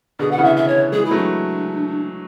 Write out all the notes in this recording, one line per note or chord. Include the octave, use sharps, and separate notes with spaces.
B2 D3 G#4
F#5
C#3 E3
E5
E5
C#5
E3 G#3 G#4
E4
F#3 A3
D4